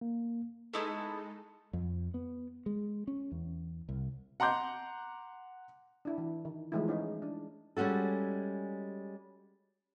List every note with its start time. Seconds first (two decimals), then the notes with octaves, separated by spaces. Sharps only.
0.01 A#3
0.73 G#3 A3 B3 D#4 E4 A4
1.73 F2
2.14 B3
2.66 G#3
3.07 C#4
3.32 E2
3.89 C2
4.40 F#5 A#5 C6 D6 G6
6.05 D4 E4
6.18 E3
6.45 D#3
6.72 E3 F3 G#3 A3 D#4 E4
6.88 C#4 D#4 G#4
7.22 D4
7.77 G3 G#3 C#4 F#4 A4